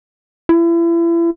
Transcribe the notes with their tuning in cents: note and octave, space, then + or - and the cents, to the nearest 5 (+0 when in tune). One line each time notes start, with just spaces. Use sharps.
E4 +35